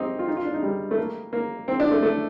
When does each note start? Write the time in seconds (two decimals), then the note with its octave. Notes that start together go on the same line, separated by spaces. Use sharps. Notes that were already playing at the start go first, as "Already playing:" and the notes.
Already playing: C4 D#4 G4
0.19 F4
0.28 D#4
0.37 F4
0.45 D4
0.54 D#4
0.63 G3
0.91 A3
0.98 A#3
1.33 A#3
1.68 C4
1.80 D4
1.91 A3
2.03 A3